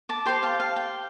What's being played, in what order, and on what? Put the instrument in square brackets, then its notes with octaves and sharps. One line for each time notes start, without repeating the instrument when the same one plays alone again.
[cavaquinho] A5 D6
G4 C5 G5 C6
F5 A5
F5
G5